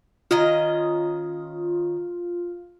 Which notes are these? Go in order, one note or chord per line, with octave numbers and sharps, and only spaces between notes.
D#3 C#4 F4 D#5